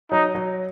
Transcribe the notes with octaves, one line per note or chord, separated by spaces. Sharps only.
F#3 D#4
F#3